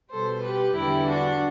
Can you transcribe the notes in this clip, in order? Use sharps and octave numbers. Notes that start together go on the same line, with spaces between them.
B2 G3 A4 C5
G4 B4
E2 D3 G3 E4 G4
D4 F#4